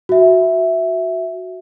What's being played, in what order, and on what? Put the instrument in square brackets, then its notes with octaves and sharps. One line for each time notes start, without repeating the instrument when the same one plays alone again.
[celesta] F#4 E5